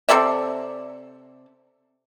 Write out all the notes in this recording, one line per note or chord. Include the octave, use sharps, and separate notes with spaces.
C3 A4 D5 E5